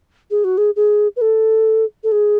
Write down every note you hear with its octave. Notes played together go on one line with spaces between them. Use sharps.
G#4
F#4
G#4
G#4
B4
A4
A4
G#4